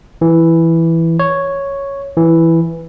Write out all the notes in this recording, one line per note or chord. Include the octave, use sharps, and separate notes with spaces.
E3
C#5
E3